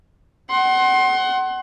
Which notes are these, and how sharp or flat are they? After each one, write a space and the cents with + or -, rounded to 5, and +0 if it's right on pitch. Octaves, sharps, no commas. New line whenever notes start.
F#5 +25 C6 +25